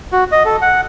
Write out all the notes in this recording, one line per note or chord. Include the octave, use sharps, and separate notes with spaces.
F#4
D#5
A4
F#5